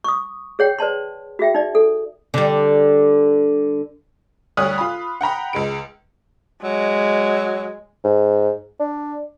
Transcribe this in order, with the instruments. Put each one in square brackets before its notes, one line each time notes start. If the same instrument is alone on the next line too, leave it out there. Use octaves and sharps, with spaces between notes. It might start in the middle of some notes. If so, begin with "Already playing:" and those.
[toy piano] C#6 D#6
G#4 C#5 F#5 G5
B4 D5 A5 C6
F#4 G#4 E5 G5
D#4 D5
A4
[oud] D3 G3
[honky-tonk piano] D2 G3 C#5 D#6 F#6
F4 B5
F#5 G5 A#5 B5
C#2 G#3 D7
[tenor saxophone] F#3 [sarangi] G#3
[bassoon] G#2
D4